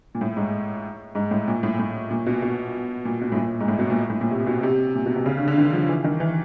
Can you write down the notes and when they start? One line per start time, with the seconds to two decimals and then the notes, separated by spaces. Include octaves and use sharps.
0.15 A#2
0.21 A2
0.37 G#2
1.15 G#2
1.31 A2
1.48 A#2
1.63 A2
1.79 A2
2.11 A#2
2.26 B2
2.42 B2
3.05 A#2
3.21 B2
3.32 A2
3.36 A#2
3.60 G#2
3.68 A2
3.79 B2
3.90 A#2
4.10 A2
4.21 A#2
4.31 C3
4.46 B2
4.63 C3
4.95 A#2
5.06 B2
5.16 C3
5.26 C#3
5.37 D3
5.48 D3
5.58 D#3
5.73 F3
5.89 E3
6.04 D#3
6.20 E3